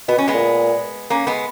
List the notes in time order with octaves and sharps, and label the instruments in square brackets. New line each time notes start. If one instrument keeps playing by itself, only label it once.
[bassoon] B2 [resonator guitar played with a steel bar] B3
[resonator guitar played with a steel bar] C#4
G#3 B3
[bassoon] A#2
[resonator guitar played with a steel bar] A#3 C#4
G#3 B3